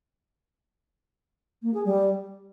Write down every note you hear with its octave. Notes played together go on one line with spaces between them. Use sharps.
A#3
G#4
G3